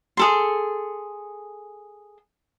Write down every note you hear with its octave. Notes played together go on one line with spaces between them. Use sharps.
G#4 A4 C6